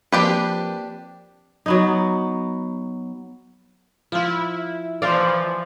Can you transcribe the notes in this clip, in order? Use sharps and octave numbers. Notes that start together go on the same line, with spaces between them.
F3 A#3 C4 D4 G4 B4
F#3 B3 D#4
F3 E4 F4
E3 F3 D5 F5